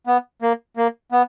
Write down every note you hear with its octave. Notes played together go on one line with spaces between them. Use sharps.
B3
A#3
A#3
B3